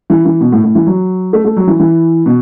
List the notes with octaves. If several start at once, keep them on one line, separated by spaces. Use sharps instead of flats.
E3
E3
B2
A2
A2
E3
F#3
A3
A3
F#3
E3
E3
B2